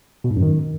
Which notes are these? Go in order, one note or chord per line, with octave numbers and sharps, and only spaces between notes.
B2
G#2
F#2
D#3